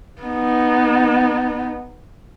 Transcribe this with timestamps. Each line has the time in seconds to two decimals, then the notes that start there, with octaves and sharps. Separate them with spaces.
0.22 B3 D#4